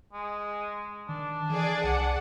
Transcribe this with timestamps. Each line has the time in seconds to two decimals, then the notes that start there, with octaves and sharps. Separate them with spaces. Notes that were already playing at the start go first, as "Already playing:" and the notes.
0.13 G#3
1.09 D#3 D4
1.50 E3 G#4 D5
1.84 C2 F#5